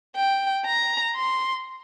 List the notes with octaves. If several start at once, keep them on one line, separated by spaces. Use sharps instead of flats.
G5
A#5
C6